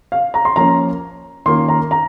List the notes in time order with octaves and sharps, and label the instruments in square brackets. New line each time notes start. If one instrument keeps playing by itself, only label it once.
[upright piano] F5
A#5
C6
[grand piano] F3 A#3 C#4 [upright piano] A#5
[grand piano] D#3 A#3 C#4 F4 [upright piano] C6
[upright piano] A#5
A#5